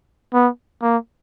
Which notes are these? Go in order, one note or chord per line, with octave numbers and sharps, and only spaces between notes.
B3
A#3